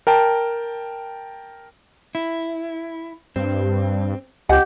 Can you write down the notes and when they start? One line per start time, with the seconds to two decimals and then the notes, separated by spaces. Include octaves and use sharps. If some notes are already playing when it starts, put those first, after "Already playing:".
0.07 A#4 G5 A5
2.15 E4
3.36 G2 C4
4.49 C#2 G4 D#5 F#5 G#5